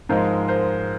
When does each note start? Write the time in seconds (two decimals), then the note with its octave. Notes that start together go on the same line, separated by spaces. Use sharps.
0.09 G#2 F3 G#3 A#4 C5
0.48 A#4 C5